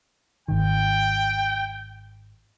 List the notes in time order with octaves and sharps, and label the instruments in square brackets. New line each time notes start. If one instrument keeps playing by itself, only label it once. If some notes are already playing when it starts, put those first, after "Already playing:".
[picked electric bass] G#1 D#3 [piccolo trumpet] G5